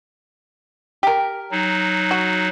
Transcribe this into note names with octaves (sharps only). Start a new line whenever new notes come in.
G4 A#4
F#3 D#4
F#4